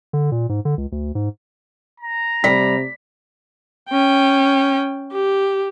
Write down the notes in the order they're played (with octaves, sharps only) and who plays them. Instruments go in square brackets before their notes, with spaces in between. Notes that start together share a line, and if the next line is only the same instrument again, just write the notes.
[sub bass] D3
A#2
G#2
D3
C#2
D2
G#2
[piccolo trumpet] A#5
[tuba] C3 [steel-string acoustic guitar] G3 [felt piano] B6
[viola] C#4 G5
G4